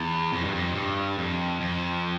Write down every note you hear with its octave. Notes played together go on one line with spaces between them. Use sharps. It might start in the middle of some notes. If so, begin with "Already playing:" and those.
Already playing: E2
F2
G2
F2
G2
F2
F2